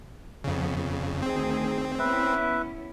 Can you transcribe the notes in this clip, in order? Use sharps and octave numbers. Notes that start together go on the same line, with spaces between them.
F2 C#3 F3 B3
D2 D#3 C4 G#4
B3 C#4 E4 B4 E5